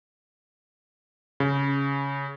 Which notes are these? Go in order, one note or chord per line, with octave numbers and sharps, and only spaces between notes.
C#3